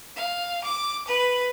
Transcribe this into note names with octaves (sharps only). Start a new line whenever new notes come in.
F5
D6
B4